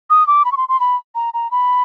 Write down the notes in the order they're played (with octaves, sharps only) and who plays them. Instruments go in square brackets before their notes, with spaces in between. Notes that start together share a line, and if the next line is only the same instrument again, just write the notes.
[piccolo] D#6
D6
B5
C#6
C6
C6
B5
A#5
A#5
B5